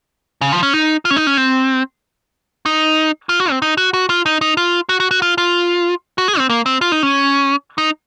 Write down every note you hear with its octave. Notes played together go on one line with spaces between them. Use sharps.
C#3
F3
C#4
D#4
F4
C#4
D#4
C#4
C4
D#4
F4
F#4
C4
D#4
F#4
F#4
F4
D#4
D#4
F4
F#4
F#4
F#4
F4
F4
F#4
G#4
C4
A#3
C4
F4
D#4
C#4
D#4